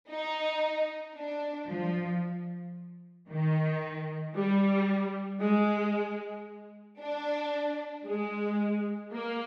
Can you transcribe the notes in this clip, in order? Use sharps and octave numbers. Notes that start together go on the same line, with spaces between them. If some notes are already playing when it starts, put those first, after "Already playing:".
D#4
D4
F3
D#3
G3
G#3
D4
G#3
A#3